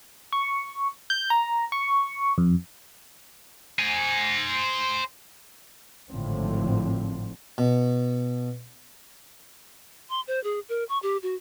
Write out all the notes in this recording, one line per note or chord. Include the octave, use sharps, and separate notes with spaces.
C#6
G6
A#5
C#6
F2
C5 G#5
G#1 A2 D3 F3 C4
B2
C6
C5
G#4
A#4
C#6
G4
F#4